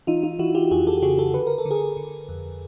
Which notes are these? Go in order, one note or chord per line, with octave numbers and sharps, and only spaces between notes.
E3 D#4 F4
D#4 F4
E3 E4 F#4
F4 G4
F2 F#4 G#4
G4 A4
C#3 F#4 G#4
G4 A4
D3 B4
A#4
A4
D3
G#4 A#4
D3
F2